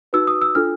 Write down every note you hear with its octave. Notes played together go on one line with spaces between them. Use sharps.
D#4 F#4 B4 E6
D#6
E6
D4 F4 A4 F6